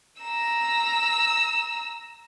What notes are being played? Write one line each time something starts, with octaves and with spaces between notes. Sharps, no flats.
A#5 E6